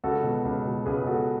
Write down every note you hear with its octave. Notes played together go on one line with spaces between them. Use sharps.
C#2 F#4 A4
B2
C#2
B2
C#2 G#4 B4
B2 F#4 A4